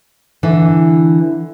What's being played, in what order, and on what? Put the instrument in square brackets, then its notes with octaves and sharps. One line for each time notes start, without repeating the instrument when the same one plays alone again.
[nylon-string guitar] D3 E3 D4